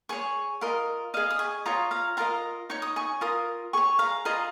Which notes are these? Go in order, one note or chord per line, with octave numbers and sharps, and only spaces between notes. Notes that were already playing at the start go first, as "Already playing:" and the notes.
G#4 C#5 G#5 C#6
F4 A#4 D#5
G#4 D#5 F5
D#6
G#5 C#6
F4 C#5 A#5 D#6
F5 A#5
F4 A#4 D#5 F5 A#5
D#4 C#5 C#6
D#6
G#5 C#6
F4 A#4 D#6
G#4 C#5 G#5 C#6
F5 A#5
F4 G#4 D#5 F5 A#5